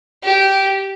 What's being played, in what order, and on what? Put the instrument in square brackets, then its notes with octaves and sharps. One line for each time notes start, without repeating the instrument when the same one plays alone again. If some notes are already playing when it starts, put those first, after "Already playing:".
[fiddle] G4